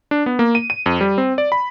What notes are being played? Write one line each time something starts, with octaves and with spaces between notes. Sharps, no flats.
D4
B3
A#3
D#7
D#7
F2
G3
C4
D5
B5